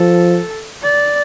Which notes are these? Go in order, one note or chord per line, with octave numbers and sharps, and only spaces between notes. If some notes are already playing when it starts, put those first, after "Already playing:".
Already playing: F3 A4
D5